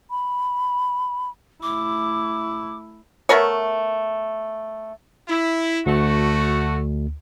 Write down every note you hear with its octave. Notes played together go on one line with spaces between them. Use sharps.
B5
A3 E4 D6
A3 B3 A#4 C#5
E4
D2 A3 F#4